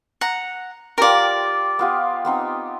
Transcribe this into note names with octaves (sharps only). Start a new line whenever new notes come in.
F#5 A#5
F4 G4 A#4 D5 G5
B3 F4 G4
B3 C4 D#4